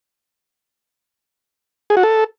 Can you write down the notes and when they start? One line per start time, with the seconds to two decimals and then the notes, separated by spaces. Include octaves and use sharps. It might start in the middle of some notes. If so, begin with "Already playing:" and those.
1.90 G#4
1.97 F#4
2.03 A4